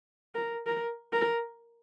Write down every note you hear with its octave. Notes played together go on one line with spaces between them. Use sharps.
A#4
A#4
A#4